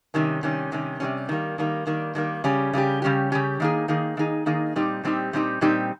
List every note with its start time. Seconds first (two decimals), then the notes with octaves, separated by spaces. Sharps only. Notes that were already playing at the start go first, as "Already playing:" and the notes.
0.14 C3 D#3 G3 C#4
0.43 C3 D#3 G3 C#4
0.72 C3 D#3 G3 C#4
1.00 C3 D#3 G3 C#4
1.29 D#3 G3 A#3
1.58 D#3 G3 A#3
1.87 D#3 G3 A#3
2.15 D#3 G3 A#3
2.44 C#3 G3 C#4 G4
2.73 C#3 G3 C#4 G4
3.02 C#3 G3 C#4 G4
3.32 C#3 G3 C#4 G4
3.60 D#3 A#3 D#4 G#4
3.88 D#3 A#3 D#4 G#4
4.17 D#3 A#3 D#4 G#4
4.46 D#3 A#3 D#4 G#4
4.76 A#2 G3 C4 D#4 G4
5.04 A#2 G3 C4 D#4 G4
5.33 A#2 G3 C4 D#4 G4
5.61 A#2 G3 C4 D#4 G4